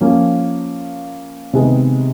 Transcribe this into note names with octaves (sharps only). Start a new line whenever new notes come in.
F3 A#3 C#4
C3 D#3 G#3 B3